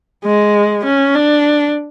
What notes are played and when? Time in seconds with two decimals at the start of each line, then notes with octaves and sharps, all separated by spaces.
0.25 G#3
0.85 C#4
1.15 D4